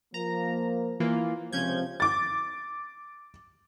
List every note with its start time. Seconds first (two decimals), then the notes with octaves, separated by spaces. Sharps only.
0.14 F3 A#3 A#5
1.00 E3 A#3 F4
1.53 C#2 C3 F3 C#4 G6 G#6
2.00 D6 A6